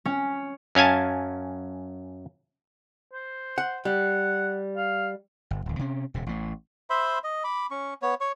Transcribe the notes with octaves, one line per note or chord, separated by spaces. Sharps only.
C#4
F#2 C#4 F5 G#5 A5
C5
F#5
G3 F#5
F5
G1
D1 D#2
C3 C#4
D#1 C3
A1 A2
C5 E5 B5 C6
D#5
B5 D6
C#4 C#6
B3 C#5
C#5 C#6